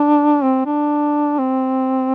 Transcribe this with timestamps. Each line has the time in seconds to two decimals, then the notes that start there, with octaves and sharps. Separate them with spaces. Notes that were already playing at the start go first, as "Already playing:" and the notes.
Already playing: D4
0.43 C4
0.66 D4
1.39 C4